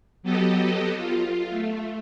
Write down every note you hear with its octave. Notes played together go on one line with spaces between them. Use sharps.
F#3 B3 G4 A4 D#5
F4
A3